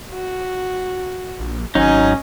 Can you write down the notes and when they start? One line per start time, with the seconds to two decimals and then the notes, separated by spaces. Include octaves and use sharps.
0.12 F#4
1.39 A#1
1.75 G#1 F#3 C#4 D#4 D#5 G#5